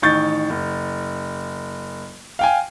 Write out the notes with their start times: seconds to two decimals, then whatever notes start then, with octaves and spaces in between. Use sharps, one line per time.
0.02 A1 D#3 C#6 G6 A6
0.50 F#1
2.39 F5 G5 G#5